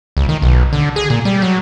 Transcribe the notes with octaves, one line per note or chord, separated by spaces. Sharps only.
C#2
D#3
B1
D3
G#4
A#2
G3
F#3